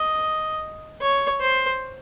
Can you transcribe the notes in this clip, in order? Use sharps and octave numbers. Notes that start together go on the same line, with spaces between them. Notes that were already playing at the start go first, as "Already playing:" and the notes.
Already playing: D#5
C#5
C5